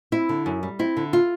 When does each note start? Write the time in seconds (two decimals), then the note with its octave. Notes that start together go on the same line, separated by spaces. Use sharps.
0.12 C4 E4
0.29 D3
0.46 F#2
0.63 G3
0.79 C4 E4
0.97 D3
1.13 F4